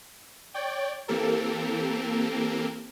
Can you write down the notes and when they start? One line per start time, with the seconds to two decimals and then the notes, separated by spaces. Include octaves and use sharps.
0.54 C#5 D5 G5
1.08 E3 A#3 C4 G4 A4 A#4